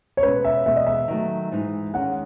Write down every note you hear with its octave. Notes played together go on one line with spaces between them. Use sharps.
C#5
B2 G#3 C#4 B4
E5
E2 B2 G#3 B3 E5
D#5
E5
D#3 F#3 A3
G#2 E3 G#3 D#4
D#3 G#3 C#4 F#5